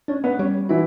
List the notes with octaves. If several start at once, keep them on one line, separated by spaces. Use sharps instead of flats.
C#4 D4
B3
G3 C#4
E3 E4 F#4